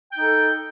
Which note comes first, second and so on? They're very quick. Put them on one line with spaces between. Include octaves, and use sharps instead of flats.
G5 D#4 A4